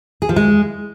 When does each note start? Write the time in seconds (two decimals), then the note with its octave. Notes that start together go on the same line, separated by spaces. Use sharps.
0.22 G#4
0.29 F3
0.36 G#3